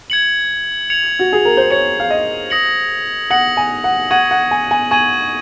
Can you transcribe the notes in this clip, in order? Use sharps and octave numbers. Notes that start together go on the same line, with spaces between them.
G#6 C#7 F#7
G#6 C#7 F7
F#4
G#4
A#4
C5
C#5 G#6 C#7 F7
F5
D#5
D#6 A#6 C#7 F#7
F#5 D#6 A#6 C#7 F#7
G#5
F#5
F#5 C#6 G#6 D#7 F#7
F#5
G#5
G#5
G#5 C#6 G#6 D#7 F#7